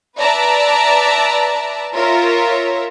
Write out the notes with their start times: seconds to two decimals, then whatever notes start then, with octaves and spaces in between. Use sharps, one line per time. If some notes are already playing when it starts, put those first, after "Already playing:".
0.19 B4 D5 E5 A5 A#5
1.95 F4 A#4 C#5 E5